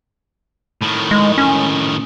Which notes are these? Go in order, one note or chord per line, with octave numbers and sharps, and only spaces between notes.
A2 D#3
G#3
C#4